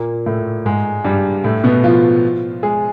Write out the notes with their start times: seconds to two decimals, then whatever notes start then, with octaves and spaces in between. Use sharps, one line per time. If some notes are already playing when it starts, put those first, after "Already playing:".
Already playing: A#2 A#3
0.26 A2 A3
0.65 G#2 G#3
1.05 G2 G3
1.44 A2 A3
1.64 B2 B3
1.83 F3 F4
2.63 G#3 G#4